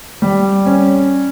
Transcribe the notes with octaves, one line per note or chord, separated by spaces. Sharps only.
G3
C#4